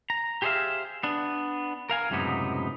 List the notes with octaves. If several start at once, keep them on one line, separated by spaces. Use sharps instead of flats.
A#5
G4 G#4 C5 D5 E5 F5
B3 D4
A#4 F5 G#5
C#2 F#2 A2 C3 B3 D#4